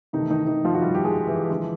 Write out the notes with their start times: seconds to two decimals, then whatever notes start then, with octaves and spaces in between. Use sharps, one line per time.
0.13 C3 D#3 E3 A3 D#4
0.30 D#3 D#4
0.47 D#3 D#4
0.65 F3 F4
0.74 F#4
0.82 G3 G4
0.94 G4
1.04 G#3 G#4
1.27 E3 E4
1.50 D3 F3 G#3